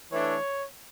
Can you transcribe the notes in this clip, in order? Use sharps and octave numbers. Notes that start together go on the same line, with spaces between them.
E3 A3 D4 C#5